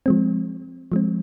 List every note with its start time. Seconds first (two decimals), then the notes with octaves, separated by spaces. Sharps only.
0.06 F3 G#3 C4
0.92 F3 G#3 C4